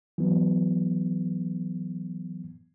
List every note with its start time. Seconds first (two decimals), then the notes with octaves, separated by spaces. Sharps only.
0.18 E3 F#3 B3